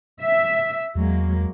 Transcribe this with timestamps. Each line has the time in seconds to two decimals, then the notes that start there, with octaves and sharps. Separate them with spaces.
0.21 E5
0.95 E2 F#3 G#3 A#3